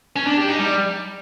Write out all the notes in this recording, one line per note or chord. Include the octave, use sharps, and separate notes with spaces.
C#4
D4
G4
D#4
G3